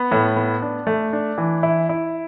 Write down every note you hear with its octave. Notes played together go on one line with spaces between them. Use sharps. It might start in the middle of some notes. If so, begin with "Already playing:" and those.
Already playing: B3
A2
B3
D4
A3
D4
E3
E4
E4